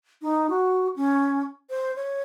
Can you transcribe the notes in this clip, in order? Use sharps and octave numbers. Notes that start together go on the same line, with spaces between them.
D#4
F#4
C#4
C5
C#5